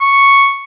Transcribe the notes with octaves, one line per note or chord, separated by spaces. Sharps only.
C#6